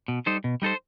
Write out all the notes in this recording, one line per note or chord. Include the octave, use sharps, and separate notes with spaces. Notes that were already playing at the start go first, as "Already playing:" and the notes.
B2
G3 D#4 A4 C5
B2
G3 D#4 A4 C5